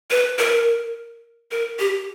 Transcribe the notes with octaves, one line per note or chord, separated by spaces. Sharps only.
B4
A#4
A#4
G4